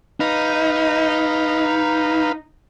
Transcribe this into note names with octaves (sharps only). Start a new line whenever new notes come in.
D#4 B4 F5